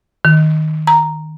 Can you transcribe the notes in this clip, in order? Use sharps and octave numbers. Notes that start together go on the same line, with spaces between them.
D#3
A#5